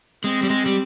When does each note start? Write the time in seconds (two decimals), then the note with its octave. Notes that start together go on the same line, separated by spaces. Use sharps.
0.24 G#3 C4
0.43 G3
0.50 G#3
0.66 G3